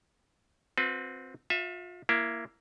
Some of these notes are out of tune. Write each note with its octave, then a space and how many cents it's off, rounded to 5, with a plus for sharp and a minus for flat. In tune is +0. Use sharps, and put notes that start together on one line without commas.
C4 +0 F#4 -45 B4 +0
F4 +35 E5 +0
A#3 +0 E4 +20